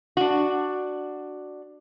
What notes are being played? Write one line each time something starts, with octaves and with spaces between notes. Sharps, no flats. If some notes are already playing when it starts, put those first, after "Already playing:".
D4 F#4